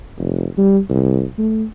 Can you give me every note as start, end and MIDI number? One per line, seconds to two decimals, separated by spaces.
0.19 0.46 29
0.58 0.79 55
0.90 1.24 36
1.38 1.64 57